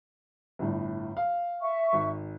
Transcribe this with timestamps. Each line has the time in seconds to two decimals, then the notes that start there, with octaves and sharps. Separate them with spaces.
0.59 G1 A2
1.17 F5
1.60 E5 C#6
1.93 G#1